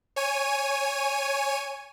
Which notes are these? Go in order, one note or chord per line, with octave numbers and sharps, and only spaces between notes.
C#5 G#5 D#7